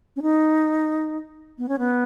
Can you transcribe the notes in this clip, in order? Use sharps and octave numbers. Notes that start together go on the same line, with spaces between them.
C#4
D#4
B3
C#4
B3